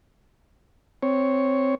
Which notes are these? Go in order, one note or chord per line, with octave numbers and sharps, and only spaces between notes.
C4 C#5